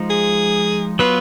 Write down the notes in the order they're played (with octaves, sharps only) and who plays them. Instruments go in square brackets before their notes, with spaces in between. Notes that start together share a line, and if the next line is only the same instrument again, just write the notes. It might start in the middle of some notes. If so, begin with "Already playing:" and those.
Already playing: [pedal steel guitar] F3 G#3 D#4
[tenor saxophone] G#4
[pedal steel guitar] F#3 B3 F4 [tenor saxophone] B4